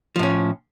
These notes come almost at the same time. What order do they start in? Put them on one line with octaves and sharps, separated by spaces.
F3 A2 C#4